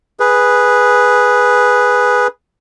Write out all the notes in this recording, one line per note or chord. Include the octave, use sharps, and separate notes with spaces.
G#4 B4